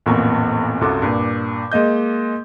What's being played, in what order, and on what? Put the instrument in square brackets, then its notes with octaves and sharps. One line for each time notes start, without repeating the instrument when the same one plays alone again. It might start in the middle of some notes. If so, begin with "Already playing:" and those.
[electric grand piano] A1 F2 A#2 B3 A#5 C#6
C2 F#2 F4 F#4 A4 D6
G2 A#2
G#3 A#3 D#5 G6